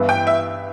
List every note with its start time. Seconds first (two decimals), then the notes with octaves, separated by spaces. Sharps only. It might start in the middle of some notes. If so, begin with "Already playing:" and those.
Already playing: G2 E3 B3 E4
0.09 G5
0.27 E5